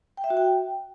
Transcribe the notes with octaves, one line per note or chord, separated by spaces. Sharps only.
G5
E5
F#4
G5